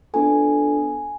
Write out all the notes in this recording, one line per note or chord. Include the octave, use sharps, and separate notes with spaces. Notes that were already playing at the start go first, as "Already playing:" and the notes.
B3 D4 F4 A4 G#5